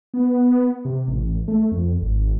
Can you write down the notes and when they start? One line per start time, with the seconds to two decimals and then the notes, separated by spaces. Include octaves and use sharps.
0.14 B3
0.85 C3
1.08 A1
1.48 A3
1.72 F2
2.01 G#1